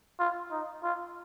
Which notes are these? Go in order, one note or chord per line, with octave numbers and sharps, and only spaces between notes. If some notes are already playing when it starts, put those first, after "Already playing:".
F4
D#4
F4